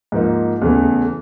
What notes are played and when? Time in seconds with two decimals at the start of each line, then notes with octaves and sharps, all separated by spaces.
0.12 G#2 F3 A#3 D#4
0.62 E2 C#3 E3 A3